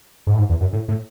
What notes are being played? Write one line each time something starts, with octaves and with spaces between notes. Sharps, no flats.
G#2
A2
G#2
E2
F#2
A2
A2